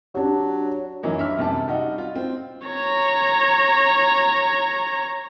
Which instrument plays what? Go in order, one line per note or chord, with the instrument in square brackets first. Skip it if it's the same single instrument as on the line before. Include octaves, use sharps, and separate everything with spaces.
[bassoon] F#3 [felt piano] D4 G4
[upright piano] F#2 E3 F#3 A#3 D#4
G2 E5 F6
F#2 C3 G3 A5
G3 D#4 F#4
F4
C4
[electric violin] C#5 A#5